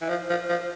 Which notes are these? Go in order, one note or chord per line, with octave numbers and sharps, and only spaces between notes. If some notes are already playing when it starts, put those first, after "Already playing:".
E3
F3
F3
F3